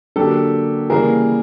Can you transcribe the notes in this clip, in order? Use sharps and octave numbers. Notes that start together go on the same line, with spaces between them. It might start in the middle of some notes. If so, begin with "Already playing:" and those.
D3 F#3 A#3 G4 A4
C#3 E3 G3 A#3 G#4 A#4